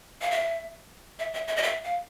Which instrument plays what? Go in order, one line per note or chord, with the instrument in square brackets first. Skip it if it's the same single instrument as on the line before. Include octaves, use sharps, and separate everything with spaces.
[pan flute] F5
E5
E5
E5
E5
D#5
E5
F5